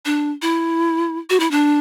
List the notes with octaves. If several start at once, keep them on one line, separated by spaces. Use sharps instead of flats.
D4
E4
F#4
E4
D4